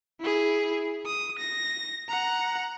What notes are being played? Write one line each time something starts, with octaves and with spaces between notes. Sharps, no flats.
E4 G#4
D#6
A#6
F#5 A#5